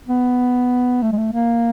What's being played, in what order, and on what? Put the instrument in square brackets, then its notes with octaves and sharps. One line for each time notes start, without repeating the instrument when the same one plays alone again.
[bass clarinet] B3
A3
G#3
A3
A#3